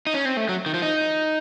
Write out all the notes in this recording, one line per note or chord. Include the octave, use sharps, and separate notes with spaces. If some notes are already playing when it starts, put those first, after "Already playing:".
D#4
C#4
C4
A3
F#3
D#3
F3
D#4